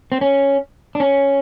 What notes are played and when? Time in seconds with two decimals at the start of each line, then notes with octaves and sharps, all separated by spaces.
0.12 C4
0.21 C#4
0.95 D4
1.00 C#4